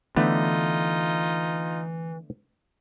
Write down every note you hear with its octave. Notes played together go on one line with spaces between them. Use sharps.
D3 E3 A3 B3 D#4 F4